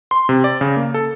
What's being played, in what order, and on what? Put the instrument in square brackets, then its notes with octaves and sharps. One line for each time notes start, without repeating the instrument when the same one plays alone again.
[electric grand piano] C6
C3
D5
C#3
A#3
A4